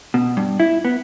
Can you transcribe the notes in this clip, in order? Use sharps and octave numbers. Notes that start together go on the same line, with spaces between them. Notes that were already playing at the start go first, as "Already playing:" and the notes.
B2
G2
E4
B3